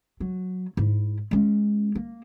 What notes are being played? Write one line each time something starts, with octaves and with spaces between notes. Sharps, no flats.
F#3
G#2 E4
G#3 C#4
A#3